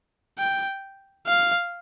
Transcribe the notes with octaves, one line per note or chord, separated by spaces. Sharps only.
G5
F5